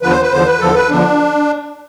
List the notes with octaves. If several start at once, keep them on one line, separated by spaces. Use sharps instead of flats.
E2 D3 F3 B4
C5
B4
E2 D3 F3 C5
B4
E2 D3 F3 A4
B4
E2 D3 F3 D4